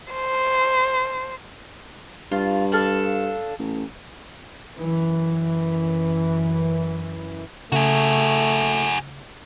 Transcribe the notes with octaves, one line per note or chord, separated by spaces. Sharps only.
C5
G2 F4
D4 A4 F5
A1
F#2 E3
C#3 A3 F#4 G#4